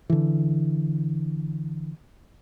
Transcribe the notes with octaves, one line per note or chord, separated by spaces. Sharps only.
D3 E3